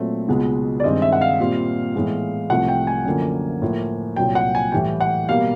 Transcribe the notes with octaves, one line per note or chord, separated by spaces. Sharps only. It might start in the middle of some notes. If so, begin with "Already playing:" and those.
Already playing: A#2 F#3 A3 C4
C#2 B2 G#3 B3
D5
G2 D#3 G#3 C4 D#5
E5
F#5
F5
A#2 G3 C4
A2 E3 G#3 B3
C2 C3 F3 A3 F#5
G5
G#5
F#2 D3 F3 A#3
A2 F3 A#3
C2 A#2 F#3 G5
F#5
G#5
A2 E3 G3 G5
F#5
B2 G3 A#3 F5